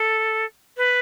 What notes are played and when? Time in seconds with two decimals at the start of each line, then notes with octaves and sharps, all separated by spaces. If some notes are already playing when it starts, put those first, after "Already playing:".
Already playing: A4
0.77 B4